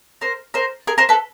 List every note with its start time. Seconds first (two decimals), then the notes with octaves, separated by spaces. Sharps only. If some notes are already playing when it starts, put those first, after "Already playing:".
0.21 A#4 C5
0.54 A#4 C5
0.87 G#4 A#4
0.98 A#4 C5
1.09 A4 B4